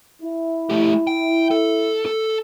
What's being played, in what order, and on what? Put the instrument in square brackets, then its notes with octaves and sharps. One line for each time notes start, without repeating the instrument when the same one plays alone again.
[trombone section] E4
[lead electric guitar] A3 G4
G5
A4
A4